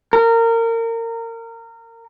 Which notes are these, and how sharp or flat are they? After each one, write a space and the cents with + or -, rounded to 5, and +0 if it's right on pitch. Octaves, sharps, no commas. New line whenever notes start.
A#4 -25